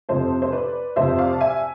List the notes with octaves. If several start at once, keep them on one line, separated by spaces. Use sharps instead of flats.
F2 C3 F3 A4 C5
C5
B4 D5
F2 C3 F3 C5 E5
D5 F5
A5
E5 G#5